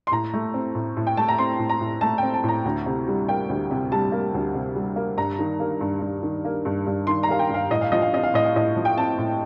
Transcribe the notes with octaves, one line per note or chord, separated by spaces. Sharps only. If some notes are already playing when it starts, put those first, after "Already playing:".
C6
A2 A#5
A3
C4
A2
A2
G5
A3 A5
A#5
C4 C6
A2
A#5
A2
A3 A5
C4 G5
A5
A2 A#5
D2
C3
G3
A#3 G5
D2
C3
G3 A5
A#3
D2
C3
G3
A#3
G2 A#5
D#3
A#3
G2
G2
D#3
A#3
G2
G2
D#3 C6
A#5
A#3 F5
G5
G2 F5
A2 D#5
F5
F3 D#5
F5
C4 D#5
F5
A2 D#5
F5
A2 D#5
F3
G5
C4 A5
A2